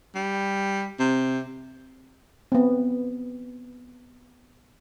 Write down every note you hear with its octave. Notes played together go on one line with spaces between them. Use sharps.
G3
C3
B3 C4